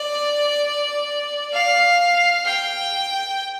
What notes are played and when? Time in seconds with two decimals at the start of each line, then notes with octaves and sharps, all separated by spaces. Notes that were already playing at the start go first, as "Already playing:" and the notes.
Already playing: D5
1.53 F5
2.46 G5